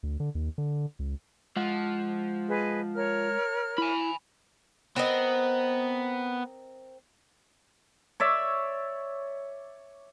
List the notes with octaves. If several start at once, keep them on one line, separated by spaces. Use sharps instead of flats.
D2
D3
D#2
D3
C#2
F3 G#3 F#5
G#4 B4 D#5
A#4 C#5 F6
E4 G#5 B5
B3 C4 A#4 D#5
C#5 D5 E5